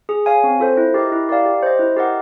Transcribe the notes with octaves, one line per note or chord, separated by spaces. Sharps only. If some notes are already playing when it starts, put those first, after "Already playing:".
G#4
C#5 F5 G#5
C4
F4 A4 C5
E4
G4 A#4 D#5
E4
G4 A#4 D5 F5
G4
C5 D#5
E4
G4 A#4 D#5 F#5